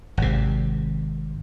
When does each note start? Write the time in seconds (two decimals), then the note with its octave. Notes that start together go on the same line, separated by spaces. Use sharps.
0.17 G#1 C3